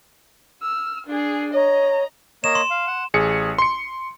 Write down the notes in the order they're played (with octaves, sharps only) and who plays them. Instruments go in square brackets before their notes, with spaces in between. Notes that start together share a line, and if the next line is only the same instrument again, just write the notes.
[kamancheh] E6 F6
D4 G#4
[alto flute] C#5 [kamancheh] D#5 A#5
[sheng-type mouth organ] A#3 C#5 D#5 [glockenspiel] E7
[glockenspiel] C6
[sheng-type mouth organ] F5
F#5
[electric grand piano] A1 G#4 C#7
C6 C#7